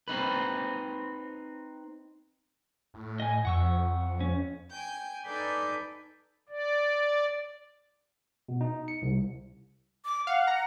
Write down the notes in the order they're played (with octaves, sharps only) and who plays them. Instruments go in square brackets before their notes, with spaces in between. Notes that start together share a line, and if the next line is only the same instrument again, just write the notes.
[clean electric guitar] C4 D#4 B4
[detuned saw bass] A2
[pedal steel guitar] D#5 G#5
[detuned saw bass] F2 [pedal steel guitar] F#5 C#6 E6
[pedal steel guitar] C#4
[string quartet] G5 G#5 G6
D#4 A4 B4 D5 G#5 G6
[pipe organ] D5
[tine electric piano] B2
D#4
C#7
C2
[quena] D6
[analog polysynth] F5 [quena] F#5
[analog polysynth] A#5